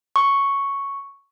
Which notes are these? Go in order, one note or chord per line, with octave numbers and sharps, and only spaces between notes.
C#6